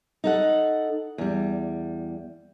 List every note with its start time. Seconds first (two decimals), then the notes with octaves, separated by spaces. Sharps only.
0.24 D#4 A4 F#5
1.18 E2 G3